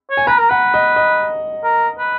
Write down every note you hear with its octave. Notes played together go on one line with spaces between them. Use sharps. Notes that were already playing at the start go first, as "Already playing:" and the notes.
C#5
G#5
B4 A#5
A#4
B4 F#5
D#5
D#5
A#4
B4